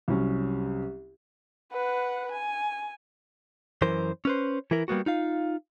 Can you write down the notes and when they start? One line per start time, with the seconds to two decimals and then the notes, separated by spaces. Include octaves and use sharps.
0.08 C2 F#3 C#4
1.72 B4 F#5
2.31 G#5
3.82 F#2 E3 A#4 C5
4.25 C#4 B4 C5
4.71 E3 E4 A#4
4.88 G3 A#3 B3 F#4
5.06 D#4 F4 F5